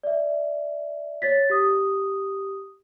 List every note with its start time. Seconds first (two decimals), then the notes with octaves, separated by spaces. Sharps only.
0.03 D5 E5
1.22 C#5 A6 B6
1.50 G4 D#6